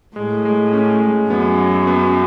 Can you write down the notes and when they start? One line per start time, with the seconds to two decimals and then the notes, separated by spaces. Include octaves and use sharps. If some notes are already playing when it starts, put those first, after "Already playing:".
0.16 A2 G#3
0.45 G#3
0.73 C#4
1.01 G#3
1.30 F#2 B3
1.58 F#3
1.87 B3